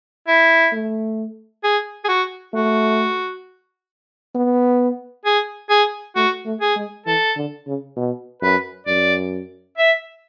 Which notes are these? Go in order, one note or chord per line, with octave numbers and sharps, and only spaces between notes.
E4
A3
G#4
G#4
F#4
A3 F#4
B3
G#4
G#4
A3 F#4
A3
G#4
G#3
E3 A4
D3
C#3
B2
F#2 B4
F#2 D5
E5